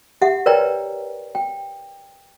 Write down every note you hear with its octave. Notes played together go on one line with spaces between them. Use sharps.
G4 E5 F#5
A#4 B4 C#5 D5 G5 A#5
G5